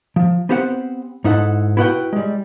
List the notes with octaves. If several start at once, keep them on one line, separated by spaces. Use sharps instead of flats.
F3
B3 C4 G4 C5 D#5 F#5
G#2 D#4 E4 A4 F#5
E4 F#4 B4 C#5 F#5 G5
G3 G#3